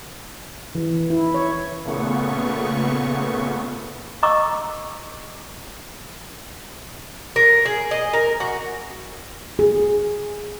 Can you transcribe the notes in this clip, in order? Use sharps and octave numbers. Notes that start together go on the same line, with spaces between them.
E3
E4
C#5
A#2 C#3 A3 B3 C#6
D#5 A#5 C#6 D6 E6
A#4
G#4
D#5
A#4
F#4
G#4